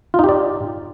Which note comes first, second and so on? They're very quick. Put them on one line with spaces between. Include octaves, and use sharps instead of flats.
F4 D#4 G4 D5